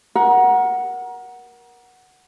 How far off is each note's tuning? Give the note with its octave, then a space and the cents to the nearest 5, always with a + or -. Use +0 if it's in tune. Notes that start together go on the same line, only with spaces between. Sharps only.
A#4 +25 F#5 +0